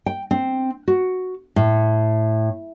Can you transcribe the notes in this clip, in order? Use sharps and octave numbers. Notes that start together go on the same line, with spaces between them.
G5
C4
F#4
A2